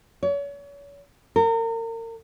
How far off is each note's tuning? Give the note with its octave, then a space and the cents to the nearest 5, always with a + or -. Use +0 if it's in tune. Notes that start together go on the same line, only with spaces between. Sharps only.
C#5 +35
A#4 -35